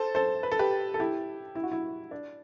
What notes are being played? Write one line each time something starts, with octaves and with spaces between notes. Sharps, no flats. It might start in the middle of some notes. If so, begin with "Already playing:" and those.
Already playing: A4 C5
A4 C5
B4
A4
G4 B4
A4
E4 G4
E4
F#4
E4
D4